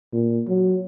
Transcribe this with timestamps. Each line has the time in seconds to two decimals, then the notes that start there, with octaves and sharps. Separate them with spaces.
0.13 A#2
0.48 F#3